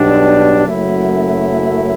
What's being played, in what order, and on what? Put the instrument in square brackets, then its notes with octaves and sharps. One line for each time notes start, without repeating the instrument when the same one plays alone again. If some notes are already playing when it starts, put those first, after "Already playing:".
Already playing: [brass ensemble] B1 B2 G3 D4
F#1 F#2 F#3 A3 E4